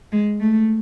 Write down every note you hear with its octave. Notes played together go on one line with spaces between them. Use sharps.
G#3
A3